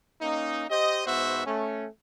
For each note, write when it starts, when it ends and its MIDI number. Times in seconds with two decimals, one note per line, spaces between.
0.20 0.64 58
0.20 0.64 61
0.20 0.64 63
0.70 1.05 67
0.70 1.05 72
0.70 1.05 75
1.05 1.41 44
1.05 1.41 59
1.05 1.41 66
1.05 1.41 72
1.05 1.41 76
1.46 1.86 57
1.46 1.86 61